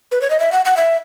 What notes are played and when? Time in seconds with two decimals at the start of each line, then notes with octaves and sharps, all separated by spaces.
0.11 B4
0.21 C#5
0.30 D#5
0.40 E5
0.52 F#5
0.65 F#5
0.77 E5